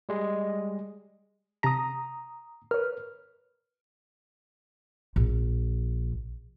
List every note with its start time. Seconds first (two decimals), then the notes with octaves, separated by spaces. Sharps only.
0.09 G3 G#3 D#5
1.63 C3 A5 A#5 D#6 A#6
2.71 A#4 B4 C#5 F6
5.16 A#1